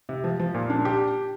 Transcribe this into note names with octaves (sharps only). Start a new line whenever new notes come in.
C3
F3
F3
A#2
D4
G4